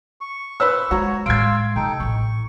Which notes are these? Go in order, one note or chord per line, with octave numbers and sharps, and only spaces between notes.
C#6
B4 C5 E6
G#3 F#4 C#5 A#5
A2 G#3 F5 C6 E6 G#6 D7
C3 D#4 A4 G5
A1 E4 C#6